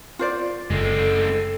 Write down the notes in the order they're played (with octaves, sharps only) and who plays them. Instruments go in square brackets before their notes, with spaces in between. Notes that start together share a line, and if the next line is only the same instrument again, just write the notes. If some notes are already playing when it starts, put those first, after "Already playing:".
[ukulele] F4 C5 D5
[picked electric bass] F#1 [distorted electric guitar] G#3 C4 [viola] A4